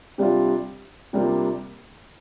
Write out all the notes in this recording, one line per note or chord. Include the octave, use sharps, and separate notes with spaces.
C3 G3 D4 F4
C3 G3 A#3 D4 F4